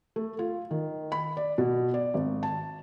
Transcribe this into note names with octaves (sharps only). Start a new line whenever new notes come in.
A3
F4
D#3
B5
D5
B2
D5
G#1
A5